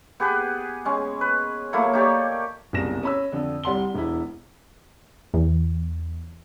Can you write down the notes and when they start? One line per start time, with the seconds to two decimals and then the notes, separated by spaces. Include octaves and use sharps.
0.20 B3 G4 G#4 B4
0.85 G#3 C#4
1.21 B4
1.73 F#3 A3 A#3 E4
1.93 D#4 G4 C#5 D5
2.73 F#1 C2 B2 A#6 E7
3.03 C#4 B5 E6
3.32 F2 D3
3.64 C2 G3 F#5 C6 G7
3.94 E1 B3 E4
5.34 E2